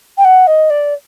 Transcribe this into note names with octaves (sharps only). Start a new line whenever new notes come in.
G5
F#5
D#5
D5